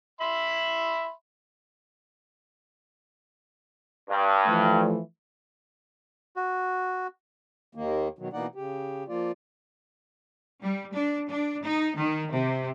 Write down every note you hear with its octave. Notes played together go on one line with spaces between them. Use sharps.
E5 B5 C6
G2
E3 F3 A3
F#4
D#2 D#3 A#3
B2 D#3 F#3
B2 E3 A#3 D#4 D5 F#5
C#3 G4
F3 A#3 F4 D5
G3
D4
D4
D#4
D#3
C3